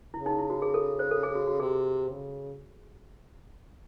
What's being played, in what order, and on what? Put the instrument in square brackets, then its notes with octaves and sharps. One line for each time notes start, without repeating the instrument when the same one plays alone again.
[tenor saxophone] C#3 [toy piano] E4
[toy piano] D#4
E4
F#4
G#4
A4
C5
A4
G#4
F#4
F#4
[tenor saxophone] C3 [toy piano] G#4
[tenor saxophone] C#3